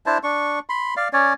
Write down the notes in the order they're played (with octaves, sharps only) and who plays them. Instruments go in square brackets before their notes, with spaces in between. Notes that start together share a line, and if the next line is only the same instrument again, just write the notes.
[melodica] D4 E4 C5 A5
D4 C#6
B5 C6
D5 F5
C#4 C#5 D5